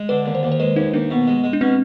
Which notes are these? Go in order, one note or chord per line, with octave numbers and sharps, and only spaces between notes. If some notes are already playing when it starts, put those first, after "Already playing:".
Already playing: G#3
D3 B4
D#2
C5
D#2
C5
G#3 B4
D#2 D#4
D#2 D4
B2
G#3
G#3
D4
B2 C4